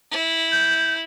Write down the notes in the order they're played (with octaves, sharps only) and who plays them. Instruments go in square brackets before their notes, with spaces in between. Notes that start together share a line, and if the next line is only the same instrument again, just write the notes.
[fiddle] E4
[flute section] G6